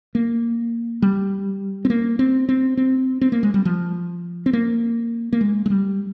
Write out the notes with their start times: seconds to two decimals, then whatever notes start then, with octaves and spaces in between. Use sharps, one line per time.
0.15 A#3
1.02 G3
1.85 C4
1.90 A#3
2.19 C4
2.49 C4
2.77 C4
3.21 C4
3.32 A#3
3.43 G#3
3.54 G3
3.65 F3
4.46 C4
4.53 A#3
5.33 A#3
5.41 G#3
5.66 G#3
5.70 G3